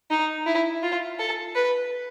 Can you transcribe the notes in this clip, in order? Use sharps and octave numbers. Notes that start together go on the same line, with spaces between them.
D#4
E4
F4
A4
B4